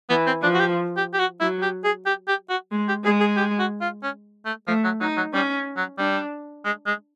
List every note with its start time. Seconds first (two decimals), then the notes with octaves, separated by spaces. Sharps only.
0.09 E3 B3
0.27 C4
0.42 F3 D4
0.54 F#4
0.60 G4
0.97 G4
1.14 G4
1.19 F#4
1.40 F#3 E4
1.62 G4
1.84 G#4
2.06 G4
2.28 G4
2.50 F#4
2.71 G#3
2.88 G4
3.05 G#3 G#4
3.20 G#4
3.37 G4
3.59 F#4
3.81 F4
4.03 C#4
4.45 A3
4.68 F3 A3
4.84 F#3
5.01 F#3 D#4
5.17 F#3
5.34 G3 C#4
5.77 F#3
5.98 G3 D4
6.65 G#3
6.86 G#3